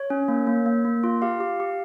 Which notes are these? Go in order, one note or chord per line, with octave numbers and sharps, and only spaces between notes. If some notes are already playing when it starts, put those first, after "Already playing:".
Already playing: C#5
C#4
A#3
A#3
A#3
A#3
F4
G4 F5
G4
G4